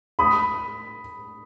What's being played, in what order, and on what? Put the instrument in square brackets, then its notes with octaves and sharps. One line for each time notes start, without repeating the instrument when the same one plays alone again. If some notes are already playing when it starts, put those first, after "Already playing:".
[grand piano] B5 D#6